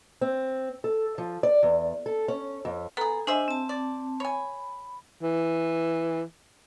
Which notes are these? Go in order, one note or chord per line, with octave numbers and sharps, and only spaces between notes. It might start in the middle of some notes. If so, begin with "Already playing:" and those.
C4
A4
F3
D5
E2
A4
C#4
F2
B3 G#4 A4 A#5
D4 G#4 C5 D#5 E5 G#5
C4 A5
D5
C#5 G#5 B5
E3